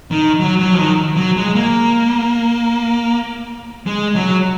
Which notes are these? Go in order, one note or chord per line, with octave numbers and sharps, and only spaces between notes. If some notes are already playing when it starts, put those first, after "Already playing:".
D#3
F#3
F#3
F3
D#3
F#3
G#3
A#3
G#3
F#3